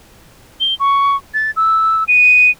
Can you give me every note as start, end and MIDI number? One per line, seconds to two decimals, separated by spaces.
0.60 0.75 103
0.80 1.16 85
1.34 1.51 93
1.56 2.04 88
2.08 2.50 99